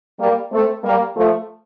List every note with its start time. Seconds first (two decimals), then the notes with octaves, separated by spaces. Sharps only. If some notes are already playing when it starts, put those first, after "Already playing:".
0.19 G3 A#3
0.52 A3 C4
0.84 G3 A#3
1.16 F3 A3